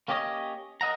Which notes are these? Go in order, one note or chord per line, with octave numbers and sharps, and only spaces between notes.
A#3 C#4 G4 C#5 D#5
A#4 D#5 E5 F#5 A#5